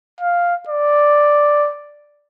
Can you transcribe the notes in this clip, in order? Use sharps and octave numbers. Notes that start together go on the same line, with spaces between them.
F5
D5